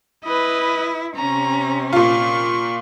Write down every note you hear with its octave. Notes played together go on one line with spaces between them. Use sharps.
E4 B4 D#5
C3 C#4 A#5
A#2 F4 C#6